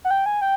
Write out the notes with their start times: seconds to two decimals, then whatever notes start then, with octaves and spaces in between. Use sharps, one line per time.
0.05 F#5
0.11 G5
0.26 G#5
0.42 G5